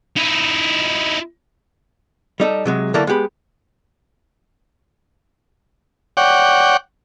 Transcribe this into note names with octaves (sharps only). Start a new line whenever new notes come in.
D#4 E4
G3 D#4 A4
C3 F#3 G#3
D3 F#3 A#3 E4 A4 A#4
G#3 B3 G4 B5
C#5 D5 F#5 G5